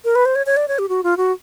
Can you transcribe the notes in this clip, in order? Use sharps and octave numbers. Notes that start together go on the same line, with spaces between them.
A#4
B4
C5
C#5
C#5
D5
C#5
G4
F#4
F4
F#4